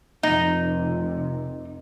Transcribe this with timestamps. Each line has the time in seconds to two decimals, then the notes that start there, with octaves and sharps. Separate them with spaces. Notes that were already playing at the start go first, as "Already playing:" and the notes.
0.23 F1 C3 D#4